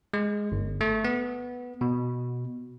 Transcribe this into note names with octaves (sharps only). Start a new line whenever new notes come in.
G#3
G1
A3
B3
B2